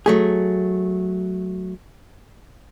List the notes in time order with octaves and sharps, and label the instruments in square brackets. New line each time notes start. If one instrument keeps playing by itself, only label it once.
[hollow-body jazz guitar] F#3 A3 G#4